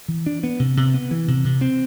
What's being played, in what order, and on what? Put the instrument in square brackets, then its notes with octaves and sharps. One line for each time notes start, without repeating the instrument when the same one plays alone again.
[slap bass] E3
D4
B3
C3
C3
B3
E3
C3
C3
C4